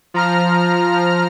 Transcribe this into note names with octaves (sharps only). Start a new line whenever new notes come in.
F3 A#5 F6